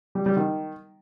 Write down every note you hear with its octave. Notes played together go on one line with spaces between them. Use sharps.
G3
G3
D#3